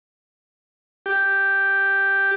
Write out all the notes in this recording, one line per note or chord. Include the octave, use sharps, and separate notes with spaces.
G4